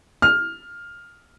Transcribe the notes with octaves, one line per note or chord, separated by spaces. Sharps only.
F6